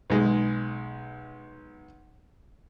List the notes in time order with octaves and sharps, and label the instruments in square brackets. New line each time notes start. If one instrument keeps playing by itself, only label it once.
[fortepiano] B1 G#3